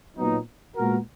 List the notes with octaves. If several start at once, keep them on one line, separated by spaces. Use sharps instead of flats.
A#2 F#3 B3 D#4
A#2 G#3 B3 F#4 A#4